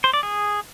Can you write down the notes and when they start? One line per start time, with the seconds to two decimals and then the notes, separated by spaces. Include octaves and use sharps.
0.04 C5
0.14 D5
0.23 G#4